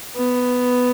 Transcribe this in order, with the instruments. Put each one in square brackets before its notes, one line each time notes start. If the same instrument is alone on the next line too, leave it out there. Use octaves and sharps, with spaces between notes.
[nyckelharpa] B3